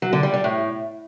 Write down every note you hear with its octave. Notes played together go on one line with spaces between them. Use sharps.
F#3
D3
G3
G3
A2